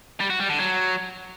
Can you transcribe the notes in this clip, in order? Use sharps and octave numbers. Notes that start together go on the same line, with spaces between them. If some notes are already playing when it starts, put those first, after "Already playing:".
G3
F#4
G3
D3
F#3